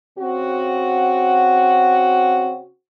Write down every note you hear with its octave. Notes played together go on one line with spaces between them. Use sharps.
C#3 C4 F#4